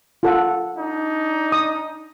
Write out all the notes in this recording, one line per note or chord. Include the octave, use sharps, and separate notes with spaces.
F4 A4 F#5
D4 D#4
D#6